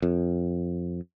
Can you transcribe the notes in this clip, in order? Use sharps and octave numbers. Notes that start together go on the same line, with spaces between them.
F2